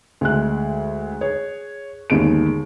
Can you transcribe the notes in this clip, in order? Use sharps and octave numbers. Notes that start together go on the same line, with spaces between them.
D2 G#3 F#6
G#4 C#5
G1 D#2 G#3 D7